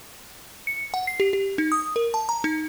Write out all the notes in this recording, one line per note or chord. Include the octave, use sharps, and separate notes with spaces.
C#7
F#5
C7
G4
G4
D#4
D#6
A#4
A5
A#5
D#4